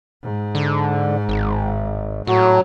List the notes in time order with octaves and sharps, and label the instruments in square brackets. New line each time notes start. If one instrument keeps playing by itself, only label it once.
[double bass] G#2
[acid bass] D3
G#1
[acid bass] A2 [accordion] F#3